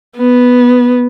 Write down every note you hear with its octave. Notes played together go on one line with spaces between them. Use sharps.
B3